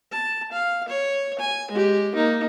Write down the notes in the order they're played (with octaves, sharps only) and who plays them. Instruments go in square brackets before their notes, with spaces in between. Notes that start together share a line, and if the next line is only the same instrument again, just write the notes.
[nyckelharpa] A5
F5
C#5
G#5
G#3 G4
A#3 D#4